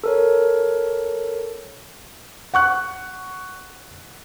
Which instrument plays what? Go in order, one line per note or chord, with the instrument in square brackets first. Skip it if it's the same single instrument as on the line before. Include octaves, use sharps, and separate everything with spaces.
[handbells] A4 A#4 C#5
[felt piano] F#5 C#6 F#6